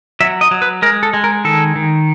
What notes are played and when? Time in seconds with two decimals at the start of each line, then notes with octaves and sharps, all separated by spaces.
0.20 F#3 E5
0.41 D#5
0.51 F#3
0.62 B4
0.82 G#3 A#4
1.03 A4
1.13 G#3
1.24 A#4
1.44 D#3 A4
1.76 D#3